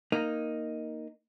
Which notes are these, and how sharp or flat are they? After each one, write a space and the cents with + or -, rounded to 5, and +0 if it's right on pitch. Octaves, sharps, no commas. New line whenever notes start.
A#3 +0 D#4 +0